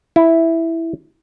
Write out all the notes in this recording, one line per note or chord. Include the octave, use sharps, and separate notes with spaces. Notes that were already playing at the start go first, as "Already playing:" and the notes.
E4